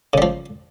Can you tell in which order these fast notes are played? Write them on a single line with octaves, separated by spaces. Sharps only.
C#3 G3 F3